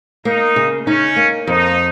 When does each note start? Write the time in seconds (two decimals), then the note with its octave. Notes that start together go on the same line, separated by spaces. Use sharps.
0.25 A#3 D#4
0.56 C#3
0.87 C#4 D#4
1.16 A#3
1.47 F2 D#4